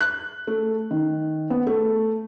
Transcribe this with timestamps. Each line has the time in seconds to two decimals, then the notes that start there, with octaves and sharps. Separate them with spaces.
0.01 F#6
0.47 A3
0.91 D#3
1.50 B3
1.67 A3